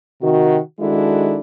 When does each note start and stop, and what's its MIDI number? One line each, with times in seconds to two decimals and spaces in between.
0.22 0.59 48
0.22 0.59 51
0.22 0.59 66
0.80 1.41 51
0.80 1.41 56
0.80 1.41 62
0.80 1.41 64
0.80 1.41 66
0.80 1.41 69